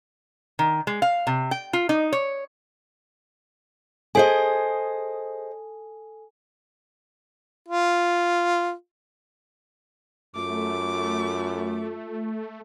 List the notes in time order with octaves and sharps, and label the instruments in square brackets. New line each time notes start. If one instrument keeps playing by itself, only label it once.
[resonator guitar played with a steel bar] D#3
G#3
F5
C3
G5
F4
D#4
C#5
[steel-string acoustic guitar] G#4 C5 D#5 [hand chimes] A4 G#5
[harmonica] F4
[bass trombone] F#2 [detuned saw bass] A3 [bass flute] F4 [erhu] D6